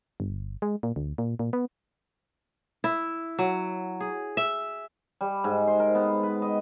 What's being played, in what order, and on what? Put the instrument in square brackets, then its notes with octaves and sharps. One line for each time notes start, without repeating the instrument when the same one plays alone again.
[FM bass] G1
G#3
A#2
D2
A#2
A#2
B3
[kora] E4
F#3
G#4
E5
[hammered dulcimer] G3
G#2
C5
A#4
B3
B4
D#5